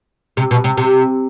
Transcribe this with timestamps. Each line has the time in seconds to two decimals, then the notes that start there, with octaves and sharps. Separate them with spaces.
0.37 C3
0.51 B2
0.64 C3
0.77 C3